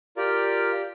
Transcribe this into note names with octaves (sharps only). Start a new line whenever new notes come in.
F4 G4 A#4 D5